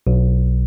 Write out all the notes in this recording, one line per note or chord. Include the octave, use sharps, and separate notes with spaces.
B1